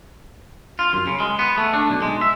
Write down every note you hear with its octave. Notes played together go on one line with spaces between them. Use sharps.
F4
F#2
C#3
G#3
B3
A3
D4
B1
G#3
E5